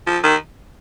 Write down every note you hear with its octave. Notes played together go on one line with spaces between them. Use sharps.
F3
D#3